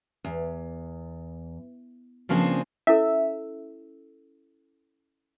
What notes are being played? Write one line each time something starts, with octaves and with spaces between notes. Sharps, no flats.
E2
C#3 F3 A#3 C4 D4 G#4
C#4 E4 A4 E5